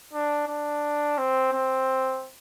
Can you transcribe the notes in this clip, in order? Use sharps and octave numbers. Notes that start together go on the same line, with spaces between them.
D4
D4
C4
C4